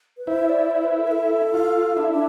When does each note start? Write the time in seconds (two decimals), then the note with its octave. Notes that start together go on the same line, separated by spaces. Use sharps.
0.17 B4
0.27 E4 C5
0.49 D5
0.70 C5
0.84 B4
0.98 A4
1.07 B4
1.12 A4
1.54 F4
1.97 D4 E4
2.12 D4